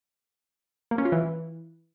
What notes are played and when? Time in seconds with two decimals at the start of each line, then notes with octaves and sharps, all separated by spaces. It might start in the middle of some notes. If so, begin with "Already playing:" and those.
0.91 A#3
0.98 C#4
1.05 F4
1.12 E3